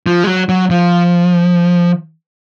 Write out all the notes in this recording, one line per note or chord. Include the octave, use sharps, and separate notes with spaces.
F3
G#3
F#3
F#3
F3